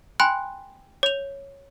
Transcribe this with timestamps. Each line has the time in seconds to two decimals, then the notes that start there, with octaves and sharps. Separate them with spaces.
0.20 G5 G#5 B5 C6 F#6
1.03 C#5 F7